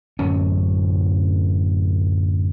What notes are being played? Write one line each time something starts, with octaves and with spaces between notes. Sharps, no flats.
D1 F#2 C#4